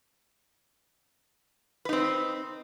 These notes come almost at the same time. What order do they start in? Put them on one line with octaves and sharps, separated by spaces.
B4 D#4 C4